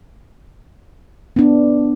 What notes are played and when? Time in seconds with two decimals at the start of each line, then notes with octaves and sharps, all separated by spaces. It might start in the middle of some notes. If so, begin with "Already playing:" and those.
1.36 B3 D4